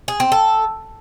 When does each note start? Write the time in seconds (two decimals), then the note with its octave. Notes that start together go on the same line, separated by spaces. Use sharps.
0.08 G#4
0.20 C4
0.32 A4